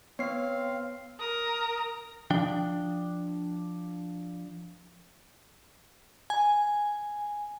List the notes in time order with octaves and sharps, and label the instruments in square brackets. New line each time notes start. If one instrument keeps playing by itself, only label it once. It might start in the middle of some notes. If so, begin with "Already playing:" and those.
[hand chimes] B3 C7 [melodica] C4 F5 [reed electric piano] C#5
[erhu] A#4 [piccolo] D#6
[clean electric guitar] F3 D4 G5
[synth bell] G#5